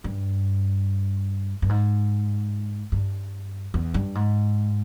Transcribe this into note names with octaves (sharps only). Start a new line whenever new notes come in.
G2
G2
G#2
G2
E2
G2
G#2